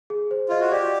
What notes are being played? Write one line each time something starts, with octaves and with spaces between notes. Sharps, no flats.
G#4
C5
F4 D#5
F#4
G4 D5